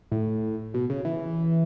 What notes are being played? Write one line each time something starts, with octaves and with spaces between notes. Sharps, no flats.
A2
B2
C#3
E3